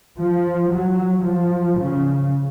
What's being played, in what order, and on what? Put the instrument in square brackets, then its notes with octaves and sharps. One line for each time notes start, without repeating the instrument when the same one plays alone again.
[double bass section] F3
F#3
F3
C#3